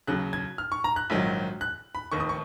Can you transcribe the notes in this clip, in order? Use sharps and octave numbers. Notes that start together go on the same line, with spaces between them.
D#2 C#3 F#3 F#6
G#6
F6
C#6
A#5
F#6
A#1 G#2 D#3 F#3
F#6
B5
F1 D#2 D#3 C#6
D#6
C#6